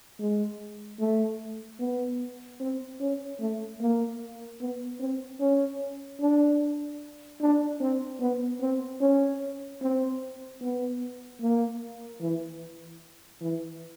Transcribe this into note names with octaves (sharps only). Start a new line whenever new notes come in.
G#3
A3
B3
C4
C#4
A3
A#3
B3
C4
C#4
D4
D4
C4
B3
C4
C#4
C4
B3
A#3
E3
E3